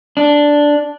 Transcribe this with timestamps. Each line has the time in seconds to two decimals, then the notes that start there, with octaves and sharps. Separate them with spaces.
0.17 D4